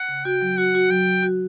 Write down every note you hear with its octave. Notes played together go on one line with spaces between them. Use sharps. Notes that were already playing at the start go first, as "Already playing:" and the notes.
Already playing: F#5
C#3
F#4 G5
F#3
F#4 F#5
F#4
F#3 G5
F#3
F#4